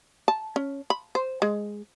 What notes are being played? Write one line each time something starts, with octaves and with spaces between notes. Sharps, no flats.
A5
C#4
B5
C5
G#3